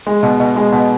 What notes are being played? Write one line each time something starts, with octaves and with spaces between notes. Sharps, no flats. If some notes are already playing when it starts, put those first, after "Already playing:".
G#3
B2
B2
G#3
B2